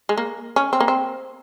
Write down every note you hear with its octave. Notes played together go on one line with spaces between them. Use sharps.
G#3
A#3
C#4
C4
A#3
C4